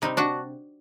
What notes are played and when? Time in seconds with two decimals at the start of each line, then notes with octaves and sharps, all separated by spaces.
0.02 C3 G3 C4 D#4
0.17 D4 F#4